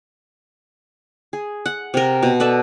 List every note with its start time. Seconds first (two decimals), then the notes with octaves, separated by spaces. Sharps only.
1.33 G#4
1.66 F#5
1.94 C3 A#4
2.23 B2
2.40 A4 B4 D5 E5